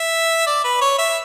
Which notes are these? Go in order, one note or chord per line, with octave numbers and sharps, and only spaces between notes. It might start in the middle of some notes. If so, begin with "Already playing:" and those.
Already playing: E5
D5
B4
C#5
E5